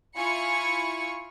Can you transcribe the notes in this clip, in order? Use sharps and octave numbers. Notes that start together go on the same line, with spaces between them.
E4 F4 G#5 B5 C#6 C#7